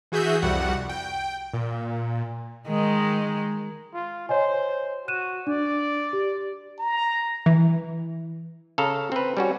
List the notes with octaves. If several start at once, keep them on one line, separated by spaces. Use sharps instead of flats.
E3 F#4 G#4 E5 G6
C2 F2 G3 F#4 F#5
G5
A#2
D#3 G#3
F4
C5 C#5 D#5 G#5
F#4 F#6 D#7 E7
D4 D5
G4
A#5
E3
C#3 A4 F5 A#5
C4 B4
G3 C#4 F#4